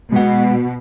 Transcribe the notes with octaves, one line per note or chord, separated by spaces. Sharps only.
B2 G#3 F#5